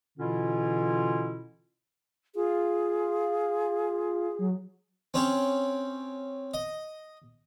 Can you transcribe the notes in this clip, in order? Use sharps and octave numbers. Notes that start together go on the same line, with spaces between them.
B2 D3 E3 C#4 E4 F4
F4 G#4
F#3
C4 C#4 G4 G#4
D#5